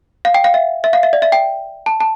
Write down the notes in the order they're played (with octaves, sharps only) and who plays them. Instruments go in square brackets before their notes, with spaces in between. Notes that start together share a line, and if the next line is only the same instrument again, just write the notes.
[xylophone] F5
G5
F5
E5
E5
F5
E5
D5
E5
G5
A5
A5